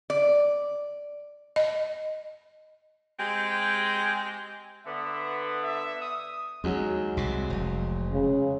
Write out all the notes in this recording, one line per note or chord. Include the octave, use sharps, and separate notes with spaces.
D5
D#5
G#3 C4 G4
D3 B3 E5
E5
D#6
D#2 F#3 G#3
C2 C3
F1
C#3